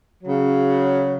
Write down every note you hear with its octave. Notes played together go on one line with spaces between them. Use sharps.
C#3 F#3